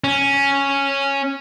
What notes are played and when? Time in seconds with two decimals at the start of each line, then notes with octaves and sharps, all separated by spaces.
0.04 C#4